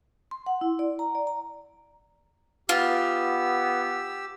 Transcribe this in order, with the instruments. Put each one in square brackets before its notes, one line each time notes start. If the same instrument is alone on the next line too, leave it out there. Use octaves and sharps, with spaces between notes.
[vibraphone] C6
F#5
E4
D5
A#5
D5
A#5
[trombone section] B3 [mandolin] F4 [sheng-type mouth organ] G4 E6